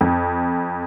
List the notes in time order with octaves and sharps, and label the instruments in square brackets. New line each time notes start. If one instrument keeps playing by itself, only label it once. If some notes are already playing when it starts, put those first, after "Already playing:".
[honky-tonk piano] F2